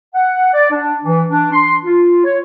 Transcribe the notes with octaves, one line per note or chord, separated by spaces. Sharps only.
F#5
D5
D4
E3
D4
C6
F4
C#5